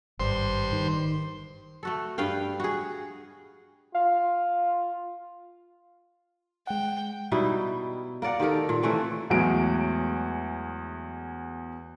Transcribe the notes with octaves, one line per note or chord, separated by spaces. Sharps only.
G#1 G2 C5 C6
D#3
A3 F#4 A4
G2 B4 F5 G5
F#4 G#4
F4 F5
G#3 F#5 G5
B2 G3 D#4 E4
A#3 A#4 D5 F#5
D#3 G4 A4 A#4
A#2
E3 A3 C4 C#4
E2 A2 F#3 G#3 D7